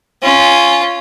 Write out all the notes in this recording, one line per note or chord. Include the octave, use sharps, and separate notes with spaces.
C#4 F4